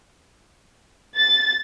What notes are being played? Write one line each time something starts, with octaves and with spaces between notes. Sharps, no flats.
A6